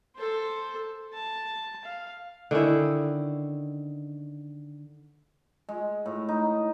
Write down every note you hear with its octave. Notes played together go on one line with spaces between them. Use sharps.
A4 C5
A5
F5
D3 D#3 C#4 E4
G#3
A2
D#4